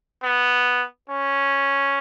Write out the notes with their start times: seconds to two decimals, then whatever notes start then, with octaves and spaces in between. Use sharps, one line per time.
0.23 B3
1.10 C#4